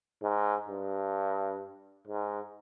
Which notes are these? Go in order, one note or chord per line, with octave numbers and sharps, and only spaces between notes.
G#2
G2
G#2